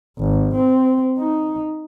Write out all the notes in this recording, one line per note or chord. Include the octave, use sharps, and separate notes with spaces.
G#1
C4
D#4